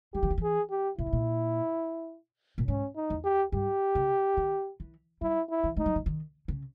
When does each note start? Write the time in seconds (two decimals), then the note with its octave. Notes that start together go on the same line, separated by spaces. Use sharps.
0.14 G3 G4
0.23 E3
0.30 D#3
0.38 E3 G#4
0.70 G4
0.98 A#2 E4
1.06 G#2
1.13 A#2
2.58 A#2
2.68 G#2 C#4
2.96 D#4
3.10 E2
3.24 G4
3.52 G2 G4
3.95 C#3
4.37 D#3
4.80 E3
5.21 G3 E4
5.50 E4
5.64 E3
5.76 G#3 D#4
5.86 G3
5.96 E3
6.06 D#3
6.48 C#3